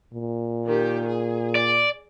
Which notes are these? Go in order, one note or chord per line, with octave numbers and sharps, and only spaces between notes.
A#2
D#3 G4
G#4
D5